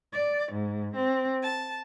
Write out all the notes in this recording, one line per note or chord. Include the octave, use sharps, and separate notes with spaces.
D5
G#2
C4
A5